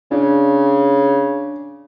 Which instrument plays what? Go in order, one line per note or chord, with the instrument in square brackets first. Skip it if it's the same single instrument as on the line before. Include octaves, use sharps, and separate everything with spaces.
[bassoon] C#3 [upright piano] D4